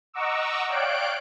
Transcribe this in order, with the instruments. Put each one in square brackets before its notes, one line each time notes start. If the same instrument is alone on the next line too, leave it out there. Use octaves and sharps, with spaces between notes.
[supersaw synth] D#5 F#5 A#5 C#6 D6 E6
C#5 D5 F5 G5 F#6 D7